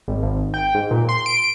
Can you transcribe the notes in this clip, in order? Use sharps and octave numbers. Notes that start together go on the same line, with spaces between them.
G#1
G#1
G5
G#2
A#2
C6
D7